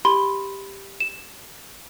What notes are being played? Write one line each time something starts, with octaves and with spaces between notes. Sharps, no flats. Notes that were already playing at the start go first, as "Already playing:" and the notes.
G4 B5 C6 G7
E7